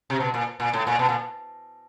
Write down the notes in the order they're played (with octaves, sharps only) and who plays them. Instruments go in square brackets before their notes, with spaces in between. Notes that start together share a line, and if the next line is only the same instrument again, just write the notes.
[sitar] C3
B2
A#2
A#2
A2
A#2
B2
A#2